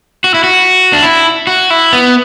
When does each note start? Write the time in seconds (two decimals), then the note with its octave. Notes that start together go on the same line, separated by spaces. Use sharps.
0.24 F#4
0.34 E4
0.44 F#4
0.93 D4
1.03 E4
1.47 F#4
1.70 E4
1.93 B3